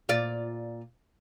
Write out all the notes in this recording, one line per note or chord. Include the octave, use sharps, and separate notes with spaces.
A#2 F4 D5